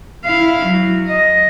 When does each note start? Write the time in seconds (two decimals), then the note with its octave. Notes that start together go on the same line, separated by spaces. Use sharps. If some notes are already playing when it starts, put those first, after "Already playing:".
0.25 E4 F5
0.66 F#3
1.08 D#5